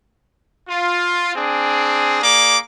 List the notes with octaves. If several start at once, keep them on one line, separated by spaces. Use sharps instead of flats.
F4
C4 D4 G#4
A#3 G#4 D5 D6